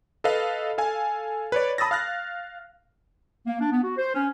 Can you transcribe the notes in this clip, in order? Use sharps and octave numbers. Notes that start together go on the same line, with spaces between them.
A4 B4 D#5 F5
A4 F5 G#5
B4 C#5 D5
A5 B5 D#6 E6 A6 A#6
F5 F6 F#6 A#6
A#3
D4
B3
F#4
C5
C#4